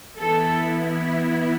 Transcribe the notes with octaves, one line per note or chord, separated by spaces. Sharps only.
E3 B3 E4 A4